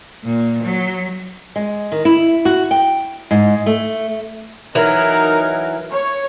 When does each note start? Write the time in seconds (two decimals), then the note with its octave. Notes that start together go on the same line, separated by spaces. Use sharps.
0.24 A#2
0.63 F#3
1.56 G#3
1.92 D#3
2.05 E4
2.45 F#4
2.71 G5
3.31 G#2
3.66 A3
4.75 E3 F#3 D#4 A#4
5.90 C#5